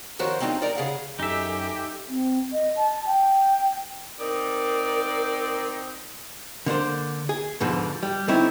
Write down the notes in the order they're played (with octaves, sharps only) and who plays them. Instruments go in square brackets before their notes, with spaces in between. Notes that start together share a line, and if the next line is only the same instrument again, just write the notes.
[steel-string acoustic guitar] D#3 F3 F#4 A#4 C5 C#5
G#3 C4 D4 D#4 F4
D#4 A#4 D5 D#5
C#3 G#4 F5 F#5
[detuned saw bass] F#2 [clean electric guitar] D#4 E5 [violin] G4 [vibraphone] A4 D#5 G#5
[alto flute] C4
D#5
A5
G5
[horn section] C4 D#4 [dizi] A#4 [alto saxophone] D5
[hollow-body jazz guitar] D3 A#3 D4 C5
G#4
D2 G#2 B2 D3 F3
G3
D3 A3 C4 D#4 E4 C#5